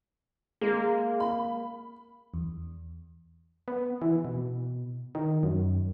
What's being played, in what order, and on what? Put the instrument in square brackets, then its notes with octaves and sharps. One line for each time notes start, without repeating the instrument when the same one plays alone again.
[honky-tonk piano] G#3 [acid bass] A#3
[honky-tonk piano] B5
[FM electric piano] E2
[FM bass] B3
E3
B2
D#3
F#2